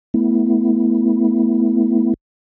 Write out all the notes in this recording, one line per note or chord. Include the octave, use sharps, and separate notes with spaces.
A3 B3 E4